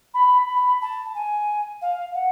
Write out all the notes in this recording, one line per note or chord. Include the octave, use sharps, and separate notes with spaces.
B5
B5
A5
G#5
F5
F#5